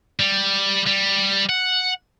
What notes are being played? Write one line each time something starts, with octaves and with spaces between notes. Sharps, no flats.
G3
G3
F#5